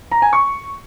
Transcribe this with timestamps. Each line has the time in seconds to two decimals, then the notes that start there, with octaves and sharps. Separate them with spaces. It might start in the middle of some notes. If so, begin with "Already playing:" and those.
0.11 A#5
0.22 G#5
0.33 C#6